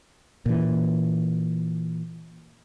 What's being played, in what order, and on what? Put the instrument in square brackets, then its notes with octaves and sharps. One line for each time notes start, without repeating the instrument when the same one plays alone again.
[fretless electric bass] A#2 E3